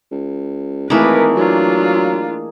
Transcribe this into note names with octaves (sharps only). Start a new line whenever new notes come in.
C#2
G#1 E3 A3 A#3 G#4 A#4 B4 D#5
F#3 D4 F4